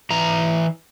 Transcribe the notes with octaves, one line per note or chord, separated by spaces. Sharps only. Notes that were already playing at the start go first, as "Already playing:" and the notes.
E3 A#5